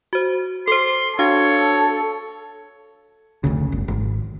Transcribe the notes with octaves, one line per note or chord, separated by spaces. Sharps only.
F#4 C5
A4 C5 C6
D4 F#4 A4 C#5 F5
F1 D2 C#3
G1
G#1